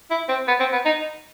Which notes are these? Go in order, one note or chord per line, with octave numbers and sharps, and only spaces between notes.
E4
C4
B3
C4
B3
D#4